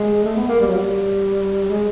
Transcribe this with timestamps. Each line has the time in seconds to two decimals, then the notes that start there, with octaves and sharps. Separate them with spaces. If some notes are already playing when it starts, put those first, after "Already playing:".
Already playing: G#3
0.24 A3
0.36 B3
0.48 A#3
0.60 G3
0.67 F#3
0.76 G3
1.68 G#3